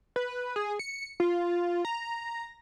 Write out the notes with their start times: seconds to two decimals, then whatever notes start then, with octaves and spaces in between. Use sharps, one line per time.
0.16 B4
0.56 G#4
0.79 C#7
1.20 F4
1.85 A#5